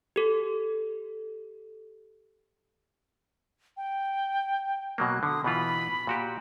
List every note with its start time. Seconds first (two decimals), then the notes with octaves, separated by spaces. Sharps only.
0.16 G4 A4
3.77 G5
4.98 B2 F#3 A#3 F#6
5.23 D3 D#6
5.44 B2 E3 F4 B5
6.07 A#2 F#4 G4